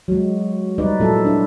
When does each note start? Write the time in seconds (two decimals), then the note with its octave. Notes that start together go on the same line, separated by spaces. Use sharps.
0.08 F#3 G#3
0.78 G3 D#4 B4 D5
1.00 A#2 F#3 A#3 E4 F4 A4
1.25 D4 E4